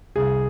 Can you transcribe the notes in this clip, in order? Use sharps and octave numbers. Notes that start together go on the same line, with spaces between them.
C2 G#4